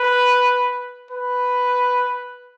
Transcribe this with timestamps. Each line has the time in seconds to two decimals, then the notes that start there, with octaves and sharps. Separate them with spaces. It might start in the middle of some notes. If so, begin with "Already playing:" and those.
Already playing: B4
1.11 B4